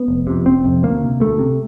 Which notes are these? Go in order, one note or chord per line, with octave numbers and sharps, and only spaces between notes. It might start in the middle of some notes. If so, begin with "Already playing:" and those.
Already playing: B3
F1
F2 C3
F1 C4
F2 C3
D2 A#3
C3
D2 A3
C3